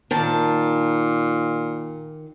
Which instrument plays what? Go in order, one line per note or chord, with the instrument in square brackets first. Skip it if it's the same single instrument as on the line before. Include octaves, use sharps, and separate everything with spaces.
[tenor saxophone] A#2 [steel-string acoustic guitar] D#3 A5